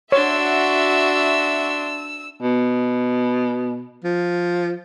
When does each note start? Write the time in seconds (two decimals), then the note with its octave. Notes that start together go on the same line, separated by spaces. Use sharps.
0.12 D4 F#4 C#5 E5 C6 E6
2.42 B2
4.04 F3